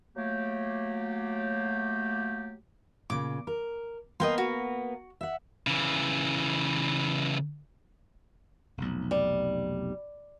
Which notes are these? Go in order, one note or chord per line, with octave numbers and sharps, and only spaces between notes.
F#3 A3 A#3 G4
A#2 C#3 D6
A#4
A#3 B3 A#4 D#5 G5 C6
F#4
E5 F#5
C#3 E3
F1 B1
G3